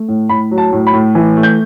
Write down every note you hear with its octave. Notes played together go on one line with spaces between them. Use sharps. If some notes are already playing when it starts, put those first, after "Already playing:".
Already playing: A3
A2
A2 B5
F#3
A5
A2
B5
A2
E3
A3
G6